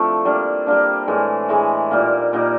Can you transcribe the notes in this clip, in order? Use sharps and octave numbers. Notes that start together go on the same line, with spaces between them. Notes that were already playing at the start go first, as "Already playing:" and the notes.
Already playing: F3 A3 C4 D4 E4
G3 A#3 D4
G3 A#3 D4
A2 E3 G#3
A2 E3 G#3
A#2 G3 A#3 D#4
A#2 G3 A#3 D#4